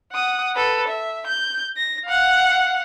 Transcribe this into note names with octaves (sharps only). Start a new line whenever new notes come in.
F#5 D#6
A4 B4
E5
G6
A#6
F5 F#5